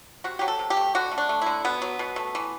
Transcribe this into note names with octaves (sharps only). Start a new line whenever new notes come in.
C3 F#4
F#3 G4
A4
C3
G4
A3
D3 F#4
A3
D4
A3
D3 E4
B2 B3
F#3
B2
A3
E3